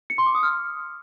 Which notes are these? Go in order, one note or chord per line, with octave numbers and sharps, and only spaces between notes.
C#7
C6
D6
D#6
F6